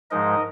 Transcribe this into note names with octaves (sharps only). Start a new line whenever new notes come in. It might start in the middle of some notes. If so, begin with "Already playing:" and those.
G#2 F3 G#3 D#4 A#4 D#5